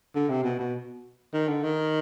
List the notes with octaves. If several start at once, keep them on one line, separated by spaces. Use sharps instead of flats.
D3
C3
B2
B2
D#3
D3
D#3